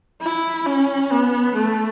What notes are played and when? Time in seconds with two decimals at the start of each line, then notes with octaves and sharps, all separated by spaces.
0.21 E4
0.66 C#4
1.11 B3
1.55 A3